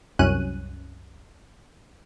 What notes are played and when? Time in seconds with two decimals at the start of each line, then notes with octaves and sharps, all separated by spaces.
0.19 C2 F#2 C#4 F#6 D#7